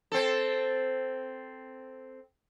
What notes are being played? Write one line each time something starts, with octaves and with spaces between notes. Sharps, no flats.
C4 A4